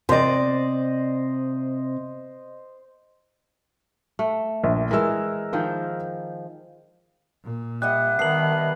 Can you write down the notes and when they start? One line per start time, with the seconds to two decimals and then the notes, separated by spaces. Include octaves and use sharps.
0.09 C3 C5 D5 D#5
4.19 A3
4.64 A#1
4.91 E3 G#3 A#4 E6
5.53 D#3 F3 C5
7.44 A#2
7.82 G3 D#5 E5 F#5 F#6
8.19 D#3 B3 A#4 A5 C7 F#7